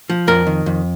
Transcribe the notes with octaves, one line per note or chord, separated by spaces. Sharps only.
F3
F2 A#4
D#3
F2